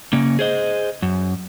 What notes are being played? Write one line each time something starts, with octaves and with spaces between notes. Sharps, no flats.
C#3 A#3 C#4
G#4 C5 D#5
F#2